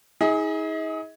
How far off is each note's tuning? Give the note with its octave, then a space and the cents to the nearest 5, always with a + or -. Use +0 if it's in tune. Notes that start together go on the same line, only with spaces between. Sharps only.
D#4 +45 G#4 +0 D#5 +40